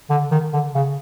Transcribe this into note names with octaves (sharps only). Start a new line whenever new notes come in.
D3
D#3
D3
C#3